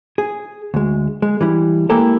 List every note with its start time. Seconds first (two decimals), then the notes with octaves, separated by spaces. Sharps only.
0.18 G#4
0.74 D2 G#3
1.22 G#3
1.41 E3 G3 E4
1.89 G#3 A#3 E4 G4 A4 A#4